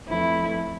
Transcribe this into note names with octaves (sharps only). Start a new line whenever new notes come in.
F2 E3 A3 E4